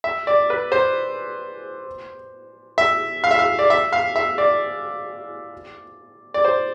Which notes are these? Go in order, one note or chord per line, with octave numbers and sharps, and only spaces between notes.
E5
D5
B4
C5
E5
F5
E5
F5
D5
E5
F5
E5
D5
D5
C5